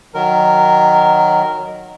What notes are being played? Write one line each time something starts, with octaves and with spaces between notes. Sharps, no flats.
D#3 F#3 A#4